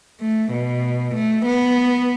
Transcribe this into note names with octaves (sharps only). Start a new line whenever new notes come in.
A3
B2
A3
B3